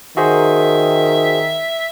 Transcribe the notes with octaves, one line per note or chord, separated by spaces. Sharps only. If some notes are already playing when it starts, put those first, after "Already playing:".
D#3 F#4 G#4 C5 E5